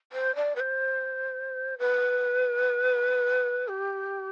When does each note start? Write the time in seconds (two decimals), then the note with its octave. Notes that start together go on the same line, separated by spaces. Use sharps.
0.13 C5
0.36 D5
0.56 B4
0.60 C5
1.79 B4
3.68 G4